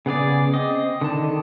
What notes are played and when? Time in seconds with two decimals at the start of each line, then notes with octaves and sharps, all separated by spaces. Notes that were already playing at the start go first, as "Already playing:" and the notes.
0.06 C#3 B3 G#4 D5
0.54 C4 D#5
1.01 D3 D#3 A5